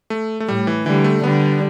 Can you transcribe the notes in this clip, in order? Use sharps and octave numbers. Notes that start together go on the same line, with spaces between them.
A3
A3
A2 G3
E3
D3 E3 G3
A3
D3 G3 B3